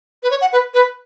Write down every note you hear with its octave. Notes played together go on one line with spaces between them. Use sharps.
B4
C#5
F#5
B4
B4